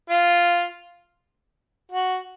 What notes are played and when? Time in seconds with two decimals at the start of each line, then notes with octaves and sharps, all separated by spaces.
0.10 F4
1.92 F#4